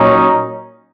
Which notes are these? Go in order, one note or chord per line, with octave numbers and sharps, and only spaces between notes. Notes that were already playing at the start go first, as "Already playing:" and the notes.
Already playing: A#2 F#3 C#4 D#4